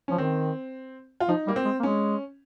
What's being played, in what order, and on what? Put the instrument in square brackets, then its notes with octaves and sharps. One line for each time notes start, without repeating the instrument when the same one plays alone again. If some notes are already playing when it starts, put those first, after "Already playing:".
[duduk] F3 [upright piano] C#4
[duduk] D#3 [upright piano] C4
[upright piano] F4
[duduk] F3 [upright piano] D#4
[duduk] G3 [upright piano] A#3
[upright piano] C4
[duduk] G#3
A#3
[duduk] G#3 [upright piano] C#4